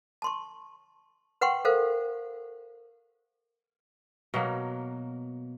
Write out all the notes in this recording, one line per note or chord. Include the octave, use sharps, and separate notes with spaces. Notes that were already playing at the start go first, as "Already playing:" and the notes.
A5 C6 C#6
B4 F#5 G5 C6 C#6
A4 A#4 C5 F5
B2 F#3 A#3